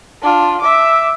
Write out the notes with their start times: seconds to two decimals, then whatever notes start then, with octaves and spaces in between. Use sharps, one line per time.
0.22 D4 F4
0.61 E5 D6